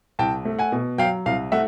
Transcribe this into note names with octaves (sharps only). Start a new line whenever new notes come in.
C2 G5 A5
A3
F#5 G#5
B2
F#3 F5 G5
C2 F5
A3 E5 F#5